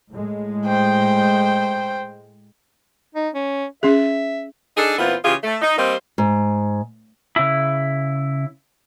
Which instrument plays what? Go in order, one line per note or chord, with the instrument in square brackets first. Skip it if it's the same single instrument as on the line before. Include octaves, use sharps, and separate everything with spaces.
[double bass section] A2 G#3
[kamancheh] C5 G5
[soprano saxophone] D#4
C#4
[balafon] C#4 G#4 [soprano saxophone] E5
[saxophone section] D4 D#4 G#4 A4
A#2 E3 B3 C4 F4
C#3 E3 F4 G4 G#4
A3
D#4
G3 A#3 C4 C5 D#5
[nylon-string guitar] G#2
[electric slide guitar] C#3 E4